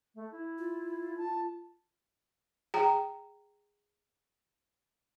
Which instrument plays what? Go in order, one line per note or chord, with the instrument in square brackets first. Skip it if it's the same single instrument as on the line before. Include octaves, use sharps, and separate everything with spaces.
[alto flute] A3
E4
[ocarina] F4
[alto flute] A5
[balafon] G#4 G5 A#5